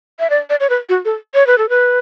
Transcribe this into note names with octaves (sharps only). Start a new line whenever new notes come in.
E5
D5
D5
C#5
B4
F#4
A4
C#5
B4
A4
B4